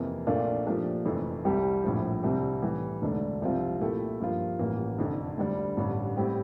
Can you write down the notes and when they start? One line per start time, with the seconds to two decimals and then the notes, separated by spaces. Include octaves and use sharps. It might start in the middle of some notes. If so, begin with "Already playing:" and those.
Already playing: F2 C3 E3 A#3
0.27 A#1 A#2 A3 D4 F4
0.66 A#2 F3 A3 D4 G4
1.05 F1 F2 E3 A3
1.45 C2 C3 G3 C4 G4
1.84 A#1 A2 F3
2.23 C2 C3 G3 C4
2.62 A2 E3 G3
3.02 E1 D2 D3 A3 D4
3.41 C2 C3 F3 C4 F4
3.81 A#2 A3 E4 G4
4.20 G2 F3 A#3 F4
4.59 A1 G2 E3 A#3
4.99 F1 F2 D3
5.38 D2 D3 G3 D4
5.77 A1 G2 D3
6.16 A2 G3 C4 G4